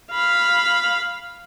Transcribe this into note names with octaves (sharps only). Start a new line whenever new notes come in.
F5 B5